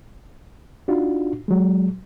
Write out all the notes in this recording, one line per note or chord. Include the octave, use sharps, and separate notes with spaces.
D4 D#4 F4 F#4
F#3 G#3